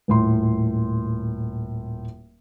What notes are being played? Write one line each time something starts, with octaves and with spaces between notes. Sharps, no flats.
D#1 A2 C6